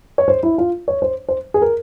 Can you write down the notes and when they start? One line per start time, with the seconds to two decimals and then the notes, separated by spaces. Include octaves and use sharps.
0.18 C#5
0.28 C5
0.43 E4
0.58 F4
0.88 C#5
1.02 C5
1.29 C5
1.54 G#4
1.62 A#4